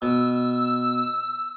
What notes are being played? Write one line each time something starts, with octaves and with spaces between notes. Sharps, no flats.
B2 E6